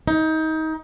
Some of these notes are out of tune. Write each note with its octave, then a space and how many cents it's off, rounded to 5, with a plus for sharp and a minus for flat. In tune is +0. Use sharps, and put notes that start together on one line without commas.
D#4 +25